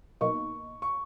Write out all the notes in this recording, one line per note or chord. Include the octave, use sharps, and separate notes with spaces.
B1 B2 A#3 D#4 C#6
C#6